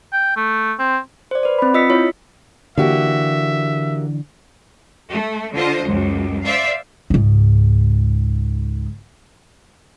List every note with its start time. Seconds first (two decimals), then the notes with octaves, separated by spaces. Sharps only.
0.13 G5
0.37 A3
0.79 C4
1.31 C5 D5
1.43 B4 D5
1.59 C4 B5
1.74 F4 D#5 E6 B6 C#7
1.90 E4 F4 C#5
2.78 D3 E3 A#3 F#4 G4 E5
5.10 A3
5.55 D3 F4 C5 D#5
5.85 C#2 F#2
6.44 C5 D5 E5 F5
7.10 C#2 G#2